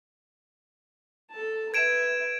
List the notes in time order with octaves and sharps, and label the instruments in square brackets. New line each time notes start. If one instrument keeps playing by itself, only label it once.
[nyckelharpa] A4 A5
[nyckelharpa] B4 E5 [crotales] G#6 D7 E7